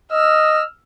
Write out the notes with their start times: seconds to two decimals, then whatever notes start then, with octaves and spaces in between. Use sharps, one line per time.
0.12 D#5 E6 F6